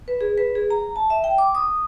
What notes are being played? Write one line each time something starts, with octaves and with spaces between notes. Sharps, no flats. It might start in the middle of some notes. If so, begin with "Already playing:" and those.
B4
G#4
B4
G#4
A#5
A5
E5
G5
D6
D#6